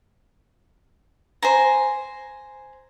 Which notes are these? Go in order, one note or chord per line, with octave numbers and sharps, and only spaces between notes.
C5 G#5 A#5